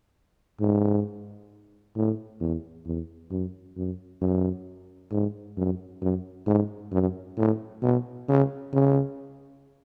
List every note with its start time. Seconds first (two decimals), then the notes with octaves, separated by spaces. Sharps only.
0.60 G#2
1.96 A2
2.40 E2
2.86 E2
3.31 F#2
3.77 F#2
4.21 F#2
5.12 G#2
5.57 F#2
6.02 F#2
6.47 G#2
6.92 F#2
7.37 A2
7.82 B2
8.28 C#3
8.73 C#3